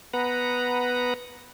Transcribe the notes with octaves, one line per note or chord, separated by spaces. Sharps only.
B3 B4 F#5 A#5